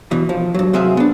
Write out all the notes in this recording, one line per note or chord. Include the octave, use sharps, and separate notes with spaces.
E2 B2 E3
F3
G2 F#3
C2 F#3 C4 G#4 E5 F5
B3 D4